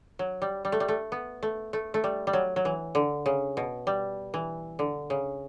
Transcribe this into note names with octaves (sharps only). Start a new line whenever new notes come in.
F#3
G3
G3
A3
G3
A3
B3
A3
A3
A3
G3
G3
F#3
F#3
E3
D3
C#3
B2
G3
E3
D3
C#3